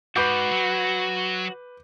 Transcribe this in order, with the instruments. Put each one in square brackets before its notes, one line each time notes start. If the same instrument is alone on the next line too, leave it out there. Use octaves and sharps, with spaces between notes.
[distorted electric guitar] G#2 [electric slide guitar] F#4 [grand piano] B4 D6 G6
[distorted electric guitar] F#3